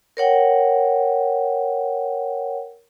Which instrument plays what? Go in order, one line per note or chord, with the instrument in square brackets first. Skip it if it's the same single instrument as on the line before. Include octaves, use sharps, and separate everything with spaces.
[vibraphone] A#4 C#5 F#5 G5